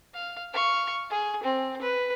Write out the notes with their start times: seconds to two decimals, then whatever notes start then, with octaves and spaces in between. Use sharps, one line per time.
0.14 F5
0.53 F5 C#6
1.10 G#4
1.43 C4
1.81 B4